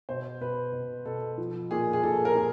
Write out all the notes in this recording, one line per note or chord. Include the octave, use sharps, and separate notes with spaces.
B2 C5
B2 B4
B2
B2 A4
F3
A#2 G#4
G#4
A#2 A4
A#4
A#2